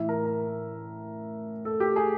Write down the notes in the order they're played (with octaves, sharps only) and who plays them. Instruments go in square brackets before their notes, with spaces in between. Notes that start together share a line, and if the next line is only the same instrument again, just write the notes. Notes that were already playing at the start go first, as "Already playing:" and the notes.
Already playing: [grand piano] A2 E3 E5
A#4
A#4
A4
G4
G#4